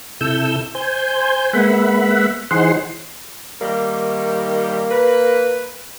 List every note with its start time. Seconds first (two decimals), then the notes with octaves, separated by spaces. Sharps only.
0.21 C3 E4 A4 E6 G6
0.75 C5 G#5 G6
1.53 G#3 A#3 B3 E5 F#5 B5
2.51 E3 D#4 G#4 C5 F#5 C6
3.61 D#3 G3 A#3
4.91 B4